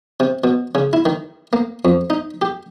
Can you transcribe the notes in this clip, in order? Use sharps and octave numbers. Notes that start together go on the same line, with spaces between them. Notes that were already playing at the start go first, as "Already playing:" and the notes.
C3
B2
C#3
E4
D#3
A#3
F2
D#4
G4